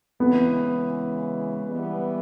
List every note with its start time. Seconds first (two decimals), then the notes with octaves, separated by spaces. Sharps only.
0.19 C#3 E3 G#3 B3
1.66 E3 G3 B3